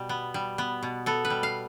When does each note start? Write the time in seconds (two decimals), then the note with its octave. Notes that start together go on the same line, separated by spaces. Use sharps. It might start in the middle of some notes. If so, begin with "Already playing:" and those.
Already playing: B2 G3
0.09 B3
0.34 G3
0.58 B3
0.83 B2
1.06 B3 A4
1.25 B4
1.30 G3
1.43 F5